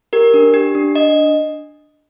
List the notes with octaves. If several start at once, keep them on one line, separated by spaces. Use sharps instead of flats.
G4 A#4
D4
G4
D4
D4 D#5